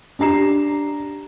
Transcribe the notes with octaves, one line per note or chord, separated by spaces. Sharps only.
D4 G4 A#5 C7 E7